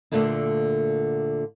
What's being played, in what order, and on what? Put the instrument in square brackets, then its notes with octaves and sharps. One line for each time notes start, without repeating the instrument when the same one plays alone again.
[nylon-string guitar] D2 A#2 D3 A3 A#3 D4